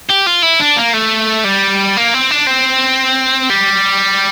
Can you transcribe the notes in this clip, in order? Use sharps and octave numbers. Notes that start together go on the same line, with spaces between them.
G4
F4
E4
D4
A#3
A3
G3
A#3
C4
D4
C4
G3